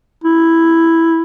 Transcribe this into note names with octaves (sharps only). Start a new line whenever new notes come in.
E4